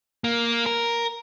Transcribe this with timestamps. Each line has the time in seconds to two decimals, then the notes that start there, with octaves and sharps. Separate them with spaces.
0.24 A#3
0.66 A#4